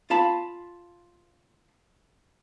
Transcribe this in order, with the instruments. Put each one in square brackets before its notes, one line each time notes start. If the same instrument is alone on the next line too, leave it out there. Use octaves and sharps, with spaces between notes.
[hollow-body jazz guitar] F4 F5 A5 B5